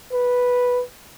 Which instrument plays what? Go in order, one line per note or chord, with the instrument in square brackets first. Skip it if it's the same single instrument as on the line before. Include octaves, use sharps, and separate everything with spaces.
[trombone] B4